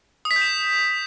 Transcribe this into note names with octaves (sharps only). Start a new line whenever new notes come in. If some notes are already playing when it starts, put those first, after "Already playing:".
D#6
B6
G6
E7